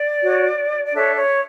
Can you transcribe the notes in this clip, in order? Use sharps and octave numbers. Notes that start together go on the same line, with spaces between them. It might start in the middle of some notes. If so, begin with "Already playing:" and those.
Already playing: D5
F#4 C#5
D5
D4 A4 C#5 E5
C#5